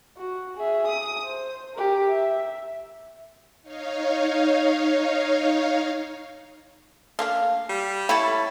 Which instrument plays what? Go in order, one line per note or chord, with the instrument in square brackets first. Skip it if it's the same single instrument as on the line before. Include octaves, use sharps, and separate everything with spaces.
[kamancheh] F#4
G#4 E5
D#6
C5
G4 A#4
E5
[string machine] D#4 C#5 F5
[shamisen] A3 A#3 D4 [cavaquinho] F5
[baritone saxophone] G3
[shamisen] A3 G5 B5 [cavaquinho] E4 C#5 A5